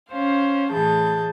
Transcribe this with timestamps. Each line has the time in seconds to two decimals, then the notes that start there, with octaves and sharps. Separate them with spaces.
0.12 C#4 C5 F5
0.71 A2 E3 G#4 A5 G6